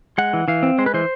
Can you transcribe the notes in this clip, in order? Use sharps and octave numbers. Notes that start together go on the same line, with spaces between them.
G#3 F#5
E3
E3 F5
C4
G#3 C5
B4
E3 C5